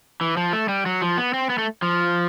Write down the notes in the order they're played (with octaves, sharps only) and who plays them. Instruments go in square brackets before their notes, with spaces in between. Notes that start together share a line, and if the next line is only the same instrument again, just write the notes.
[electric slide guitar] E3
F3
A3
G3
F#3
F3
B3
C4
B3
A3
F3